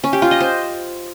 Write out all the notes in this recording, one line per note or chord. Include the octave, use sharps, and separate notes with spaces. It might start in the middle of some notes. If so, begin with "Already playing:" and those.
C#4
G4
F4
D#5
C5